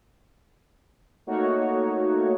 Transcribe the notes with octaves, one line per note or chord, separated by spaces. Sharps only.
A3 A#3 D#4 F#4 C#5